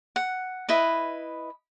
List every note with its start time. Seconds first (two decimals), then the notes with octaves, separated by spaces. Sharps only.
0.16 F#5
0.69 E4 B4 D#5